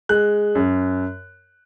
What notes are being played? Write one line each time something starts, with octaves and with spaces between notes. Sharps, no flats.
G#3 F#6
F#2